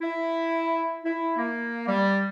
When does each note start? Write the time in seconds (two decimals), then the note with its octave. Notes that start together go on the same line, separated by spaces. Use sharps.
0.01 E4
1.04 E4
1.37 A#3
1.87 G3